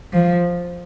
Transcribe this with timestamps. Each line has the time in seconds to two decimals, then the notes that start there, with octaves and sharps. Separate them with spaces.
0.13 F3